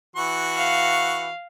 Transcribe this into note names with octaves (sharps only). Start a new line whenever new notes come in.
E3 F#4 C#6
F5